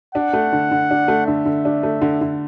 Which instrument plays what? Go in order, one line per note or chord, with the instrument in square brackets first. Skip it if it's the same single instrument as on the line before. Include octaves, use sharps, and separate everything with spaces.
[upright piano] D4 [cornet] F#5
[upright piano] A3
D3
D3
D4
A3
[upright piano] D3 [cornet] E5
[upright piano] D3
D4
A3
D3
D3